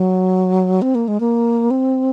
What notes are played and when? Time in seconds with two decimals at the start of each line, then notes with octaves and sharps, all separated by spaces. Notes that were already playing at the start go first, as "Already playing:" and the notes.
Already playing: F#3
0.82 C4
0.95 A#3
1.08 G#3
1.20 A#3
1.71 C4